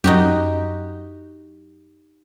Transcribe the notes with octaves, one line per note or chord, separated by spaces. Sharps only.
F#2 D#4 F#4 G4